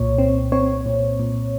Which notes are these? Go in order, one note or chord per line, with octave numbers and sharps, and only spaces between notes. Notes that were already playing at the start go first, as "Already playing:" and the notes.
Already playing: C2 A#2 C#5
C4
C4 C#5
A#2
A#2